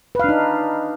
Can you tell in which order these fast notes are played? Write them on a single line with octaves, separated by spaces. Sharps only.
B4 F5 D4 D#4